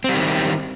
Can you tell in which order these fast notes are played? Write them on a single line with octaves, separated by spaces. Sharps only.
C4 G3 D#3